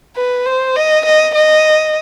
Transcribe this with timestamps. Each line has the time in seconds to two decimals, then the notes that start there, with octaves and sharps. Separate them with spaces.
0.16 B4
0.46 C5
0.76 D#5
1.06 D#5
1.35 D#5